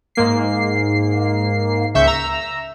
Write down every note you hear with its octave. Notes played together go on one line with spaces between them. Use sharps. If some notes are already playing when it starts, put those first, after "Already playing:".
G#2 A#3 C7
C#2 E5 C#6 G6
A#5 E6